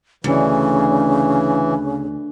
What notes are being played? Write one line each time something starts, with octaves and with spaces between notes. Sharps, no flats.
D2 C#3 E3